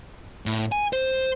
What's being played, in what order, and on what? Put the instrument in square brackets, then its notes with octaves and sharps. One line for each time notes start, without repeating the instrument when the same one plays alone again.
[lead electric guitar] A2
G#5
C5